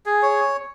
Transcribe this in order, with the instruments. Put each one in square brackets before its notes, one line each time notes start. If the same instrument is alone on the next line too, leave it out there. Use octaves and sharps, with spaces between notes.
[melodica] G#4
C#5